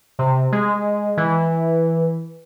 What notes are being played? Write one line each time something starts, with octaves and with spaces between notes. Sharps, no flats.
C3
G#3
E3